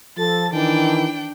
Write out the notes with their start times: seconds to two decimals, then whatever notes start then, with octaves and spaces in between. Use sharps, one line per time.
0.18 F3 A4 A6
0.53 D#3 E3 D4 G5